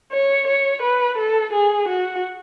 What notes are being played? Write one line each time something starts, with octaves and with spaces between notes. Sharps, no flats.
C#5
C#5
B4
A4
G#4
F#4